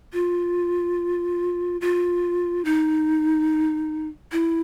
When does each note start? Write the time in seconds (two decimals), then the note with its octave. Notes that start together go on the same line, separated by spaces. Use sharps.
0.13 F4
1.81 F4
2.65 D#4
4.32 E4